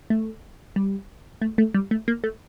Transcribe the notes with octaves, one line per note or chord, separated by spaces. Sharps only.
A3
G3
A3
A3
G3
A3
A#3
A3